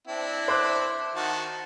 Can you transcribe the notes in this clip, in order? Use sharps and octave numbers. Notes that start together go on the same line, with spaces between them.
C4 D4 E4
C5 D6 F#6
D#3 F#4 A5